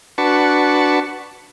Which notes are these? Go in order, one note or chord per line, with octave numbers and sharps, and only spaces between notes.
D4 F#4 B4 A5 C#6